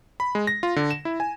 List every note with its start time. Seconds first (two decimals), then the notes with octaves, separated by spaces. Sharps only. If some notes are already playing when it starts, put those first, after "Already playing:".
0.20 B5
0.35 G#3
0.47 A#6
0.63 F4
0.76 D3
0.91 E7
1.05 E4
1.20 G#5